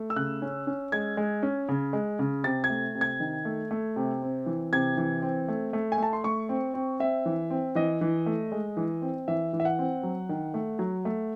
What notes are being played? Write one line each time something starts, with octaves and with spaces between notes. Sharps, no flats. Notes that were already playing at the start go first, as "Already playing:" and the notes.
Already playing: A3
E6
C#3 F#6
C#4
C#4
G#3 G#6
G#3
C#4
C#3
G#3
C#3
C3 A6
G#6
A3
C3
G#6
D#3
A3
A3
C3
C4
E3
C3 G#6
E3
C4
A3
A3
G#5
A3 A5
C6
A3 C#6
C4
C4
C4 E5
E3
C4
E3 D#5
E3
A3
G#3
E3
C4
E3 E5
E3
E5
F#5
C4
F#3
D#3
A3
F#3
A3